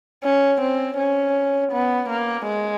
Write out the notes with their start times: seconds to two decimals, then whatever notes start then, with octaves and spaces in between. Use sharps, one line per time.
0.24 C#4
0.61 C4
0.98 C#4
1.72 B3
2.09 A#3
2.46 G#3